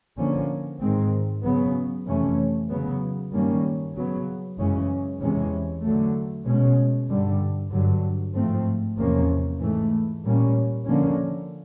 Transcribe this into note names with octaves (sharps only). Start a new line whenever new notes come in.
D3 F3 A#3 C#4
G#2 D#3 G#3 C4
C#3 F#3 B3
F2 C3 E3 A3 C#4
C#3 F#3 B3
G2 D#3 G3 A#3 C#4
C#3 F#3 B3
F#2 C#3 E3 G#3 C#4
E2 C3 E3 G#3 C#4
D3 F#3 A3
B2 G#3 C#4
G2 D3 G3
G2 D3 F#3
G#2 F3 A3 C4
E2 C3 F3 A#3 C#4
G#2 E3 A3
A#2 G3 A#3 C#4
D3 F3 A#3 C#4